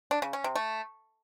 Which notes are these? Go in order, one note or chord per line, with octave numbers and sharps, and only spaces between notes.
D4
C#3
C#4
C3
A3